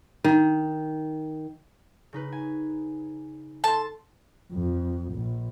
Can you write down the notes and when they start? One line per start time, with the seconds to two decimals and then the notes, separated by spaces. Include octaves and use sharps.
0.24 D#3
2.13 C#3 D#4 B4
2.32 G#5
3.64 A4 A5 C6
4.53 F2
5.14 A#1